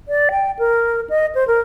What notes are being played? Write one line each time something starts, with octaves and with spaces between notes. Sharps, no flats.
D5
G5
A#4
D#5
C5
A#4